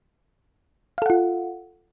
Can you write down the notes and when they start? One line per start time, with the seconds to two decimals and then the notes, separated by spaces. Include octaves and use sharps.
0.98 F5
1.02 A4
1.06 F#5
1.10 F4